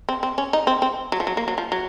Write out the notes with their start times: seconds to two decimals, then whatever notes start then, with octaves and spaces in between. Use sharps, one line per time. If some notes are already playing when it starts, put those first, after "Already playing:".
0.09 C4
0.23 C4
0.38 C#4
0.53 D#4
0.67 C4
0.82 C4
1.12 F#3
1.20 F3
1.27 F#3
1.37 A#3
1.48 F#3
1.58 F3
1.72 F#3